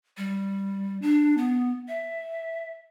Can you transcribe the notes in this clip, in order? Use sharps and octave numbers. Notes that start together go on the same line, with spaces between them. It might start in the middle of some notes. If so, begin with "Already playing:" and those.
G3
D4
B3
E5